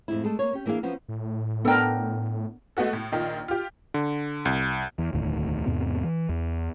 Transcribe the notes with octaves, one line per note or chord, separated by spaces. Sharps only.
F2 A2 G#3 E4
G#3 A3 A4
A#3 A#4 C#5
C#4 G4
E3 A#3 D4 G#4 F5
F3 F#3 B3 C#4
A2
B3 D4 A4 A#4 G5
G#3 A3 B3 F#4 A4
A2
A#1 D#3 F4
F4 G4
D3
C2
E2
E1 D2 A2 D#3
E2 G#2 C3 B3
E3
E2